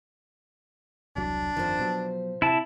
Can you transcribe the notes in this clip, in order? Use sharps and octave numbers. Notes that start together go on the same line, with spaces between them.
E1 C2 F#3 D4
G1 F2 D#3 F3 C5
B2 F#3
C3 E4 A5